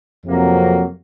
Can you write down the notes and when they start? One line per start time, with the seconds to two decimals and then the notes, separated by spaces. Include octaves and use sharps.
0.24 F2 C3 F#3 A#3